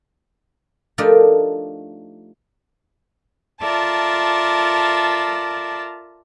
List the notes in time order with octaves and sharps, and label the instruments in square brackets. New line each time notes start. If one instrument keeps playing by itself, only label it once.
[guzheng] F3 A3 D4 D#4 G4 A#4
[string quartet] F4 A4 A#4 D5 E5 A5